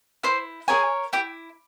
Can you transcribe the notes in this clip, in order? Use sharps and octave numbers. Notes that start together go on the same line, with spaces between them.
E4 C5 C6
G#4 A#4 C#5 G#5
E4 G4 G5